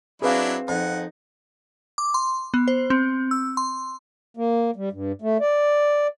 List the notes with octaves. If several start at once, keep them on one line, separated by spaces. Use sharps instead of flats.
F#3 C4 D4 E4 G#4 B4 F5
F2 D#4 F#5
D6
C6
B3
C5
C4
E6
C6
A#3
G3
G2
A3
D5